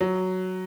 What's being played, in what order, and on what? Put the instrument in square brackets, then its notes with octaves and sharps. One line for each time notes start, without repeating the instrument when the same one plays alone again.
[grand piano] F#3